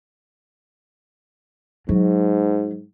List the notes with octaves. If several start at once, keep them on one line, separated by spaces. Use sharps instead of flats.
G#2 F#3